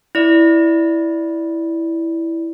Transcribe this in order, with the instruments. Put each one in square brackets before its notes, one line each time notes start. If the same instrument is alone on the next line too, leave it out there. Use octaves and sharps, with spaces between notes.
[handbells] E4 D5